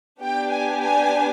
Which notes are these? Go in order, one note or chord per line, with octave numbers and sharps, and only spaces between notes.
B3 D4 G4 G5
G#5
G#5